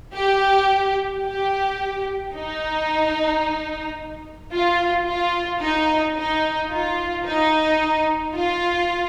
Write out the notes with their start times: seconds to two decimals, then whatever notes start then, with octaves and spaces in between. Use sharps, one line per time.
0.15 G4
1.25 G4
2.34 D#4
4.52 F4
5.07 F4
5.61 D#4
6.17 D#4
6.72 F4
7.26 D#4
8.35 F4